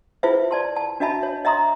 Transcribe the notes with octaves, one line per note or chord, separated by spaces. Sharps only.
E4 F4 G#4 B4 C5 E5
D5 A5 C6
A5
D4 F#4 D#5 E5 A5 B5
C#5
D#5 E5 A#5 C6 D#6